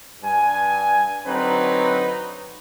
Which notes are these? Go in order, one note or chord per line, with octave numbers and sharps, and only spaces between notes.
G2 G#5
D3 F#3 C4 D#4 B4